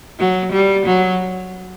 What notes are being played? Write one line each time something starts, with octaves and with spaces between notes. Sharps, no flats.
F#3
G3
F#3